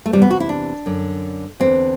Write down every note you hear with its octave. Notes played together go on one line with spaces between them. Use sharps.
A3
E2 C3 E3 G3
B3
F#4
E4
D4
F#2 D3
E2 D3 C4